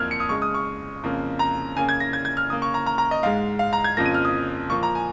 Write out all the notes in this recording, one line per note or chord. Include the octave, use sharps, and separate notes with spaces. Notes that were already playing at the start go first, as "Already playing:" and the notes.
Already playing: F2 A#3 F6 G#6
C#7
D#6
C#3 G#3 C#6
D#6
C#6
F2 C#3 A#3
A#5
C#3 A#3 G#5
G#6
A#6
G#6
G#6
F6
C#3 A#3 D#6
C#6
A#5
A#5
A#5
D#5
G#2 G#3 F5
F5
A#5
G#6
F2 C#3 F3 A#3 A#6
D#7
F6
D#6
A#2 F3 A#3 C#6
A#5
G#5